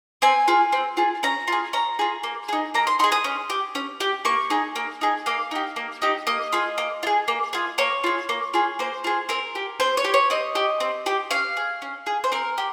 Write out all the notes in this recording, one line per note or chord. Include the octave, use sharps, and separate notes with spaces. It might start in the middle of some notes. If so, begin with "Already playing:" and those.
C4 G#5
F4 G#4
C4
F4 G#4
C#4 A#5
F4 G#4
C#4 A#5
F4 G#4
A#3
D#4 G#4
A#3 A#5
C6
D#4 G#4 C6
D#6
C#4
G4
C#4
G4
A#3 C#6
D#4 G#4
A#3
D#4 G#4
A#3 F5
D#4 G4
A#3
D#4 G4
A#3 D#5
F4 G#4
A#3
F4
G#4
A#3
F4 G#4
A#3 C#5
F4 G#4
A#3
F4 G#4
A#3 C5
F4 G#4
C4 A#4
G4
C4 C5
C#5
G4
C#5
C4 D#5
G4
C4
G4
C#4 F5
G#4
C#4
G#4
C5
C4 A#4
G4